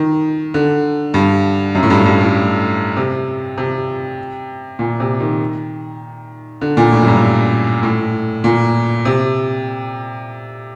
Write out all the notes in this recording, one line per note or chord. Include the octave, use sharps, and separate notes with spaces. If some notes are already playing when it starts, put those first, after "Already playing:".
Already playing: D#3
D3
G2
F#2
A2
G2
G2
A2
C3
C3
A#2
C3
D#3
D3
A#2
A2
F#2
G2
A2
A#2
C3